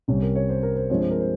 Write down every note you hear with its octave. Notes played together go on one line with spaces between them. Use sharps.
C2 C3 G3 C#4
A#4
C#5
C5
A#4
C5
G2 F3 G#3 C4 C#5
C5
A#4
C5